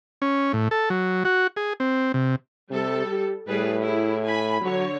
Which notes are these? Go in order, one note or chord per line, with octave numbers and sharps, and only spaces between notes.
C#4
A2
A4
F#3
F#4
G#4
C4
C3
C3 G3 A4
G4
A2 G3 G#4 B4
E4 G#4
G#5 B5
D3 F#3 C#5